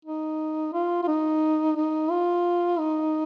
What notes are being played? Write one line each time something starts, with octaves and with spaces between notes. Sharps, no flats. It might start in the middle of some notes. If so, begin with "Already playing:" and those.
D#4
F4
F4
D#4
D#4
F4
D#4